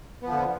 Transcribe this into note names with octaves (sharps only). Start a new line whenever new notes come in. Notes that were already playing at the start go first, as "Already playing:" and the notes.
D3 F3 B3